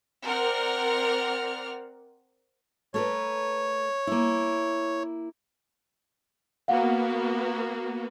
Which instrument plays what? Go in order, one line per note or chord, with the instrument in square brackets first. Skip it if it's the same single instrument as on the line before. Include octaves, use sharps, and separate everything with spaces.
[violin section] C4 A#4 D5 F#5 F6
[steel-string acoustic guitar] A3 A#4 B4 [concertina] C#5
[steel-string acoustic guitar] A#3 E4
[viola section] A#3 B3 F#4 [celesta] F5 F#5